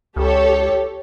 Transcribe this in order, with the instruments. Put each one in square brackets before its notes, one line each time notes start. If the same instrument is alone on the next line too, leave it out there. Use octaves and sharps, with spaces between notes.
[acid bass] C#2 [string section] G4 A4 C#5